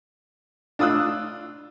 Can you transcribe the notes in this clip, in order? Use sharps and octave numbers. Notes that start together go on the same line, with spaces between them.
D4 F4 D#6 E6 F#6